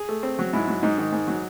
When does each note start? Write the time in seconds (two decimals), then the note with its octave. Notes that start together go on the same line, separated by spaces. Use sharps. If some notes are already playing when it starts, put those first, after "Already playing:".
Already playing: G#4
0.09 A3
0.23 C4
0.39 F#3
0.53 G#2 E4
0.67 F#3
0.83 G#2 D#4
0.98 D#3
1.12 G#2
1.27 F#3